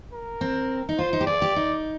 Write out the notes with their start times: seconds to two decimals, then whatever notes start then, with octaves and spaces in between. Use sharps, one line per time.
0.13 A#4
0.41 C4
0.89 D#4
0.98 F4 C5
1.13 D#4
1.21 G4
1.27 G#4 D5
1.42 G4
1.56 D#4